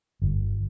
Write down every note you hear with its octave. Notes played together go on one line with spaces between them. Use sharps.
G1